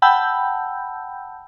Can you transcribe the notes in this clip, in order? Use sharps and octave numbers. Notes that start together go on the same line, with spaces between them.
F#5 G5 A5 B5 E6 G6